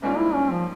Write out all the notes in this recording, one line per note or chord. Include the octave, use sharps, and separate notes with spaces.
G#1 G#2 G3 A#3 C#4 F4
E4
C#4
F3